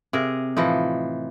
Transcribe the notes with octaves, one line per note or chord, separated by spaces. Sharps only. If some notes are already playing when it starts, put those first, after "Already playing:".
C3 G#4 A#4
A2 E3 F3 D#4